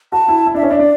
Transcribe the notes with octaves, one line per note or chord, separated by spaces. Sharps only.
F#4 A5
E4
E4
D4 E5
C#4
D4 E5
D4 D5